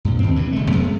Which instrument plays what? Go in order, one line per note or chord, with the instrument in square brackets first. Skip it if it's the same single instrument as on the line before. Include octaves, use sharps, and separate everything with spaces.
[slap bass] G2 A#2
D#2 C4
G2 C3 E3
D#1 D2 G#3 A3
F2 G#3 B3
A2